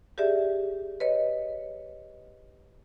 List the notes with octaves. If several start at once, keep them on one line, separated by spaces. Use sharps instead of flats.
G4 G#4 D5 E5
B4 C#5 D#5